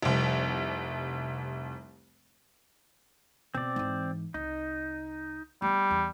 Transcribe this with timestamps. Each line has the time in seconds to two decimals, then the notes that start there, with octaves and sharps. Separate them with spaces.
0.02 F1 C2
3.55 B2 C4 D5
3.76 G#2 E3
4.34 C2 D#4
5.62 G3 A3 B3
5.91 E2